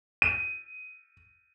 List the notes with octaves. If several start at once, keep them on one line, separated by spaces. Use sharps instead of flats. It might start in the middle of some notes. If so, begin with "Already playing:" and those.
D#7